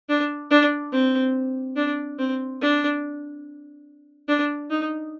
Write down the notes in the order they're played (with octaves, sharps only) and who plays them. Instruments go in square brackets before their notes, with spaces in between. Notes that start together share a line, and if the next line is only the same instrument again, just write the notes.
[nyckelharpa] D4
D4
C4
D4
C4
D4
D4
D#4